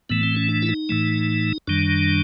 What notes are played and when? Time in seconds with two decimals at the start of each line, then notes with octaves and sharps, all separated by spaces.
0.10 A2 E3 A3 B3
0.23 C4
0.36 C#4
0.49 D4
0.62 E4
0.69 D#4
0.89 A2 E3 A3
1.68 F#2 D#3 G3 D4